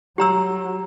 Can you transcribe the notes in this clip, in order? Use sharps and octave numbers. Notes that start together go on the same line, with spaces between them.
F#3 G4 A#5 E6